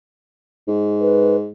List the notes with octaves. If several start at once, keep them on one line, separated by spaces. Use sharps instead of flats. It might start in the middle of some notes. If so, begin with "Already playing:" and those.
G#2
B4